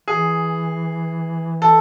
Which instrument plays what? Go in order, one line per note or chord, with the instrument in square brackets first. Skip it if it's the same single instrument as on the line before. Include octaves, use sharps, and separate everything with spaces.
[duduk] E3 [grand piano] G#4
[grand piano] A4